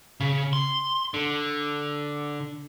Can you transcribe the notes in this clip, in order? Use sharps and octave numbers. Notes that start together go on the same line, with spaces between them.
C#3
C6
D3